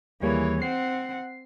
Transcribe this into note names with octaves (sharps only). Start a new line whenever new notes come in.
D#2 E3 G3 A#3 G#4 C#5
C4 F#5 C7